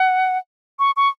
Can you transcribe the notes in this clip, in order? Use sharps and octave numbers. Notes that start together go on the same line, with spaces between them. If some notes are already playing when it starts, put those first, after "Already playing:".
Already playing: F#5
C#6
C#6